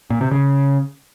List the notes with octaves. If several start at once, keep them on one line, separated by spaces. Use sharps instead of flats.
A#2
C3
C#3